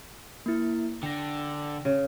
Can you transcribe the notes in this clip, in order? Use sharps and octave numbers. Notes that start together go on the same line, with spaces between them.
A#3 E4
D3 G5 A#6
C#3